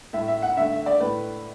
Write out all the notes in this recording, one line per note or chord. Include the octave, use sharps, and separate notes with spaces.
A2 A3 E5
E5
F#5
D3 A3 E5
E5
D5
A2 A3 B4